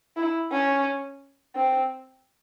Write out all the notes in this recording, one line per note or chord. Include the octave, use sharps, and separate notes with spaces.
E4
C#4
C4